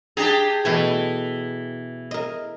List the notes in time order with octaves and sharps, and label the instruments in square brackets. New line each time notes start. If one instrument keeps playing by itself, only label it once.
[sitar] D4 G4 G#4 [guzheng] A#5
[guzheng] B2 A3 G#5 [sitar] E3
[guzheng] A#4 D#5